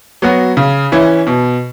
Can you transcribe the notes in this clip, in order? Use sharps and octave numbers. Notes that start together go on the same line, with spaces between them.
F#3 B3 F#4
C#3
E3 C#4 E4
B2